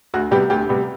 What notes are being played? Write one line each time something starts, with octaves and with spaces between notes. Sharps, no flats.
D2 F#4
C3 G3 B3 G4
D2 G4
C3 G3 B3